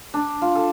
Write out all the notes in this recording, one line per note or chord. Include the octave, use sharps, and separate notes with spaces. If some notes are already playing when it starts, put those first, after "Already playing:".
D4
F4
A4